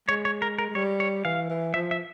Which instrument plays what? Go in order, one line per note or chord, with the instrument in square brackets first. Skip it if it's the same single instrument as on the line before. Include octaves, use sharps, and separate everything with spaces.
[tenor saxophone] G#3 [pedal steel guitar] C#5
[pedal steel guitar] C#5
A#4
A#4
[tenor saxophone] G#3
[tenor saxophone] G3 [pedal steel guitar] C#5
[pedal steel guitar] C#5
[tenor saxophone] E3 [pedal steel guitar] F5
[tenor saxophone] E3
[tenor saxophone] F3 [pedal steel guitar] E5
[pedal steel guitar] E5